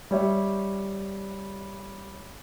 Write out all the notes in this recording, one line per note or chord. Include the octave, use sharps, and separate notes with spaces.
G3 C#5 E5